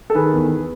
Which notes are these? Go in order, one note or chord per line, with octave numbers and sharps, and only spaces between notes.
A4
D#3 G#4 B4
E2